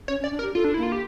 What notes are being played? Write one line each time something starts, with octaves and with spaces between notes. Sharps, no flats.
C#4 C#5
C#4
D5
D4
A#4
G4
F4 A4
D4
A#3 E4
F4
G4